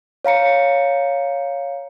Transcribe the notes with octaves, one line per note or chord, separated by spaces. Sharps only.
C#5 F5 A#5 C#7